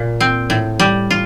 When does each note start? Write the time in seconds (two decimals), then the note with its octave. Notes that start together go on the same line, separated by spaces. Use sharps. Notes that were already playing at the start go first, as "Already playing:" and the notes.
Already playing: A#2
0.21 C4
0.50 A2
0.80 G3
1.11 F4